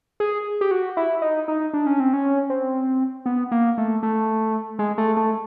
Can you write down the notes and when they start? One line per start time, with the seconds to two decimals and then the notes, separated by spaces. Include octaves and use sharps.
0.20 G#4
0.61 G4
0.71 F#4
0.97 E4
1.22 D#4
1.48 D#4
1.73 D4
1.87 C#4
2.00 C4
2.13 C#4
2.50 C4
3.26 B3
3.51 A#3
3.78 A3
4.03 A3
4.79 G#3
4.98 A3
5.17 A3